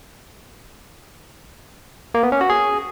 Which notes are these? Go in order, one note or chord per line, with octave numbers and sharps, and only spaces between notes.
A#3
B3
C#4
F#4
G#4